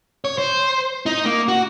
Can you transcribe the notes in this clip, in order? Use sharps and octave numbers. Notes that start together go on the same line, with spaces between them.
C#5
C5
D#4
A#3
F#4